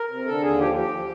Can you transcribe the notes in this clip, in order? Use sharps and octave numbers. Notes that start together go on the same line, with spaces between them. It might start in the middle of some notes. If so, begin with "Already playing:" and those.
Already playing: A#4
C3
D3 A4
D#2 G#4
F3 G4
F3 G4
F3